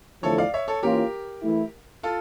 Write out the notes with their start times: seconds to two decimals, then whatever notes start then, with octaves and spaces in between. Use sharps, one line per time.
0.23 E2 D3 F3 A3 E4 A4 C#5
0.38 D5 F5
0.54 C#5 E5
0.68 A4 C#5
0.83 E3 A#3 C#4 F4 G4 A#4
1.43 E3 A3 E4
2.03 F4 A4